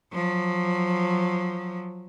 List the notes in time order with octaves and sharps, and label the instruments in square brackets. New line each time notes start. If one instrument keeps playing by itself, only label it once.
[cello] F3 F#3